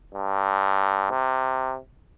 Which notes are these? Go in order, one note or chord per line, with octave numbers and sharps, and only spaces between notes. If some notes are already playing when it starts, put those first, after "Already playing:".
G2
C3